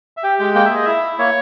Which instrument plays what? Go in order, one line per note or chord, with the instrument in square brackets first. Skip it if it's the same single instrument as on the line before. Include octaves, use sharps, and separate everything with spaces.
[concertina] E5
G4 G5
G#3 G5
A#3 G5
E5
G#4 D#5
E4 E5
E4
A#3 C#5